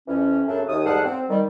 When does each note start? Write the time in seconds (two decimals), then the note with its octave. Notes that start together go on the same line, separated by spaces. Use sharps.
0.08 F2 E3 C#4
0.47 F#2 C#3 F#3 A3 C4 D4
0.69 D#2 D#6
0.86 E2 G#2 G3 A4 F5 F#5
1.05 C4
1.30 D#3 G3